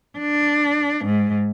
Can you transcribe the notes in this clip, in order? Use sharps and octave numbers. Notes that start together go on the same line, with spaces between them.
D4
G#2